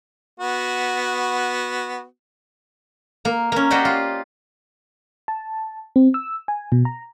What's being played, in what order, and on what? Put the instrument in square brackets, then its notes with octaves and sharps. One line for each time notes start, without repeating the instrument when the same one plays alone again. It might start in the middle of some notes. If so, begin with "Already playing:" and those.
[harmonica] B3 F#4
[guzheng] A#3
A#3 C#4
F#4 G4 C5 D5 D#5
F4
[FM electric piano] A5
C4
E6
G#5
B2
A#5